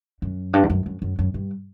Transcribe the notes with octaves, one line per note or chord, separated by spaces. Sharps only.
F#2
G2
E2
F#2
F#2
F#2
F#2
G2